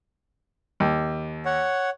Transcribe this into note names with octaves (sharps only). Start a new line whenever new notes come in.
D#2
C#5 F#5